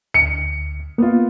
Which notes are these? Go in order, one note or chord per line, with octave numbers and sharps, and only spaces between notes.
D2 C#7
A#3 B3 F4